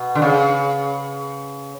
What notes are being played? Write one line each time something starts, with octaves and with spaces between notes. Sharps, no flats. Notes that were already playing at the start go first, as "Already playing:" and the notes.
Already playing: B2
D3
C#3